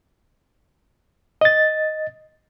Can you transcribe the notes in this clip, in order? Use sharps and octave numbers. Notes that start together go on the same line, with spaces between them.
D#5 A6